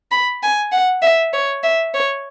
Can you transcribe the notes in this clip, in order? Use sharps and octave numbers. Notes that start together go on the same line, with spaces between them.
B5
G#5
F#5
E5
C#5
E5
C#5